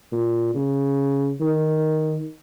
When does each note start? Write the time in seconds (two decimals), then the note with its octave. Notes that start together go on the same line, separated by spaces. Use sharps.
0.12 A#2
0.55 C#3
1.40 D#3